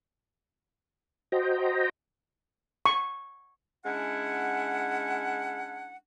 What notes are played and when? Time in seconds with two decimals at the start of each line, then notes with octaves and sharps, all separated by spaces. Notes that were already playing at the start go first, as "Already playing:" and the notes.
1.32 F#4 C5 D#5 G5 A#5
2.86 C#6
3.85 G#3 C#4 D4 E4 F#5